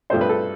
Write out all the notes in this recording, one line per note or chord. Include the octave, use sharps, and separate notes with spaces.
G2 F3 A3 C4 C5
B4
A4